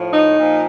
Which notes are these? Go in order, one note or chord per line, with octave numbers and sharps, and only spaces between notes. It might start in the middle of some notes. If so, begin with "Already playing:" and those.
Already playing: A2 F3
D#4
A#2 F3